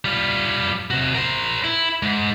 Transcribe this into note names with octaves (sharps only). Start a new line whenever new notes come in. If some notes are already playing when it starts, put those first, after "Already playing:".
G3 F4
C3 F#4
A#4 C5
E4
G#2